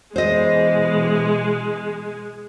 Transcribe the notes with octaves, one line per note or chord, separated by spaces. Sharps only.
B2 E3 G#3 C5 D#5